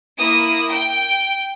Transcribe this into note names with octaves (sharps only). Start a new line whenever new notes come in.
A#3 E4 D#6
G5